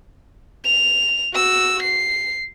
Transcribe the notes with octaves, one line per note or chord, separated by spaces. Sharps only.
F7
F#4 E6
C7